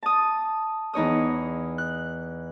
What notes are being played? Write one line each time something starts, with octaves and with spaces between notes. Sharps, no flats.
A5 D#6
E2 D#4 C#5 D#6
F#6